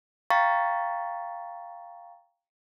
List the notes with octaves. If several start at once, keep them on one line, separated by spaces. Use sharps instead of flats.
F5 G5 A#5 C#6 A6 B6